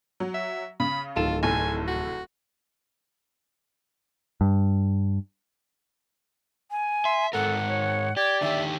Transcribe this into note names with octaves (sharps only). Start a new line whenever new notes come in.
F#3
E5
C#3 B5
D1 D#3 F4 A4 E7
F1 A2 A4 G#5
F#4
G2
G#5
E5 C6
G#2 A4 A#4 F#5
C#5
G4 D5 G#6
D3 D#3 G4 E5